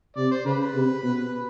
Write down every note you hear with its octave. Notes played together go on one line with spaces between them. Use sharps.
C3 D5
C5
C#3 B4
C3
B2